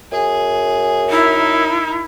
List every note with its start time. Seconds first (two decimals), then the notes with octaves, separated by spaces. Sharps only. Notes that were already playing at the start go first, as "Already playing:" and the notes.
0.12 F#2 G#4
1.09 D#4 E4 A#4